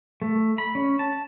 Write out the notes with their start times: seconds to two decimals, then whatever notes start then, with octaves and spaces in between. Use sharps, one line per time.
0.22 A3
0.58 B5
0.75 C#4
0.99 A5